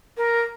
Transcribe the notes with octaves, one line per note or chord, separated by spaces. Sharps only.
A#4